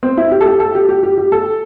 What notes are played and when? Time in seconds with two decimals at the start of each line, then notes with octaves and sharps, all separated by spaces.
0.03 C4
0.17 E4
0.32 G4
0.41 A4
0.46 G4
0.60 A4
0.75 G4
0.89 G4
1.03 G4
1.18 G4
1.32 A4